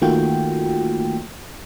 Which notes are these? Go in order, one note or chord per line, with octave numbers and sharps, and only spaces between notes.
D#3 A3 A#3 F4 F#4 G5